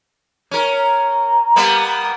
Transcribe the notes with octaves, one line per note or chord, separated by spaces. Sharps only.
C#4 A#4
A#5
G3 A#3 B3